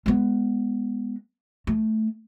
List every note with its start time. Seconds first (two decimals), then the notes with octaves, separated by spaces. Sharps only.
0.06 G#3 B3
1.67 A3